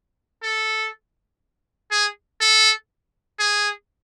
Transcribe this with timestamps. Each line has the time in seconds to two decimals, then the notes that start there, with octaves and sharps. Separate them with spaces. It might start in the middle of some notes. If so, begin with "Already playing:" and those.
0.43 A4
1.91 G#4
2.41 A4
3.40 G#4